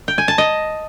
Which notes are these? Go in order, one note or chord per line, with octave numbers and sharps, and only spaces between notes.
G5
G#5
A5
D#5